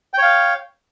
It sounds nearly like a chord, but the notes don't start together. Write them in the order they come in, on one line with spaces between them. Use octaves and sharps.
G5 C#5 F5